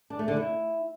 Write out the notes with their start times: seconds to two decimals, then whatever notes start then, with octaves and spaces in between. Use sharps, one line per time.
0.10 D4
0.19 A3
0.28 D3
0.37 E4